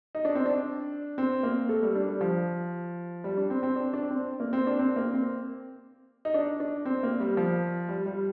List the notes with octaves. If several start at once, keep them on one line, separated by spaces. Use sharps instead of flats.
D#4
D4
C4
D4
C4
A#3
A3
G3
D4
G3
F3
G3
D4
C4
C4
D4
D4
C4
A#3
C4
D4
C4
A#3
C4
D#4
D4
D4
C4
A#3
G3
F3
G3
G3